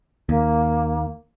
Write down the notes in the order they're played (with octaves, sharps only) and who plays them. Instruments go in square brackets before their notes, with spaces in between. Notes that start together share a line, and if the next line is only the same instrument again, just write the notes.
[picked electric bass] D#2 [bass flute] A#3